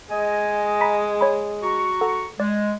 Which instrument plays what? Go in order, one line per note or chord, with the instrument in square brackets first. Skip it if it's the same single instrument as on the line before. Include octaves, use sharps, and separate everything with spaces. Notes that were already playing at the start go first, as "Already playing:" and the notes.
[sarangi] G#3 [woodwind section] D#5 G#5
[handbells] A#5 B5 B6
C#5 G#5 B5
[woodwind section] F#4 A#5 C#6
[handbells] A4 F#5
[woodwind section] G#3 [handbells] D5